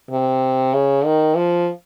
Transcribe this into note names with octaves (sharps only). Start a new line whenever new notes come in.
C3
C#3
D#3
F3